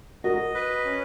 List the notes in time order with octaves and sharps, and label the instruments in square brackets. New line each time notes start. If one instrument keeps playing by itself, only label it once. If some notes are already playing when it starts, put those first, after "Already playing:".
[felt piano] F#4 A#4 [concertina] D#5
[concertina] B4
C#4